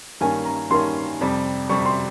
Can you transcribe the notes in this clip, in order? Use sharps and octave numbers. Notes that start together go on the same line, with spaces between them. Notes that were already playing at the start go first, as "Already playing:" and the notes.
G2 D#3 A#3 C#4 G#5
A#5
G2 D#3 A#3 C#4 C6
F2 C3 G3
F2 C3 G3 C#6
C6